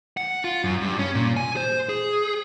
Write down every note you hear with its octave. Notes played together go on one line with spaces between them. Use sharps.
F#5
F4
F#2
G2
C#4
A#2
G#5
C5
G#4